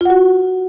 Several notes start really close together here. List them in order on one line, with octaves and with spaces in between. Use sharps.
F4 F#5 F#4